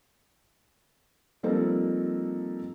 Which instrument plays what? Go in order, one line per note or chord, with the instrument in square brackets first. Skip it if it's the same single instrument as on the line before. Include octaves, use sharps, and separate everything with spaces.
[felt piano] F3 G3 A#3 C4 D#4 A4